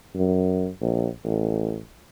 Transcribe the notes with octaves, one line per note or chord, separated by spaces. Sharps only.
F#2
A#1
A1